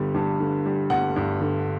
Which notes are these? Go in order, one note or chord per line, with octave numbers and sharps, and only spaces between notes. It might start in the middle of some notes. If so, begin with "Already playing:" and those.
Already playing: G1 D3 G3
G2
D3
G3
G1 F#5
G2
D3